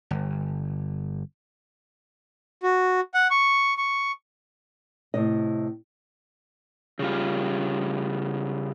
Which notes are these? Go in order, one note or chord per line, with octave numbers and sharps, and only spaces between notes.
G1
F#4
F#5
C#6
C#6
A2 C3 D#5
C#3 G3 F4